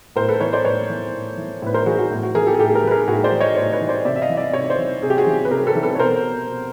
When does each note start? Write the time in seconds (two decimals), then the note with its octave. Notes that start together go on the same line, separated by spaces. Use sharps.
0.16 A2 A#4 C5
0.28 A4 B4
0.40 E3 B4 C#5
0.53 C5 D5
0.65 A2 B4 C#5
0.89 E3
1.13 A2
1.38 E3
1.62 A2 B4
1.74 A#4 C5
1.86 E3 F#4 G#4
1.98 F#4
2.10 A2
2.23 F#4
2.35 E3 G#4 A#4
2.47 G4 A4
2.54 G#4
2.59 A2 G4 A4
2.75 G#4 A#4
2.84 E3 B4
2.91 G#4 A#4
3.07 A2 F#4 G#4
3.24 C5 D5
3.32 E3
3.41 C#5 D#5
3.56 A2 C5 D5
3.72 B4 C#5
3.81 E3
3.89 C5 D5
4.05 C3 D5 E5
4.16 E5
4.22 D#5 F5
4.30 E3
4.37 D5 E5
4.53 C3 C#5 D#5
4.70 C5 D5
4.78 E3
5.02 C3 G#4
5.10 G4
5.18 F#4 G#4
5.27 E3
5.45 B4
5.51 C3 G#4 A#4
5.67 A4 B4
5.75 E3
5.83 A4 B4
5.95 C#5
5.99 B2 A#4 C5
6.48 B2